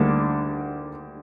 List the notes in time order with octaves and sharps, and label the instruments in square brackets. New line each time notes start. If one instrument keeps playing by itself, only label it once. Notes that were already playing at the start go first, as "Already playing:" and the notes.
Already playing: [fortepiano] D2 D3 G3 A#3 D4